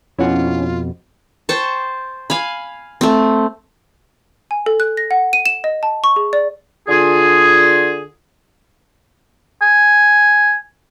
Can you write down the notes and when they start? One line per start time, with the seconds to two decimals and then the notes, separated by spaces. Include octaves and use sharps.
0.19 F2 B2 C#4 E4 F4 F#5
1.49 C5 G5 A5 C#6
2.30 F5 G#5 B5
3.01 A3 C4
4.51 G#5
4.66 A4
4.80 F#6
4.97 A#6
5.11 F#5
5.33 D#7
5.46 E7
5.64 D#5
5.83 A5
6.04 C#6
6.16 G#4
6.33 D5
6.88 D3 F4 G#4
9.62 G#5